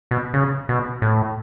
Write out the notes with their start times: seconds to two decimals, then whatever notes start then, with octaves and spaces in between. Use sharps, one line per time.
0.11 B2
0.34 C#3
0.69 B2
1.02 A2